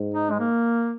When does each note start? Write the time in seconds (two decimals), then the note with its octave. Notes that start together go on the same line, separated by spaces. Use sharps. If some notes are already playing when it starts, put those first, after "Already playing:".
Already playing: G#2
0.14 D#4
0.31 G#3
0.40 A#3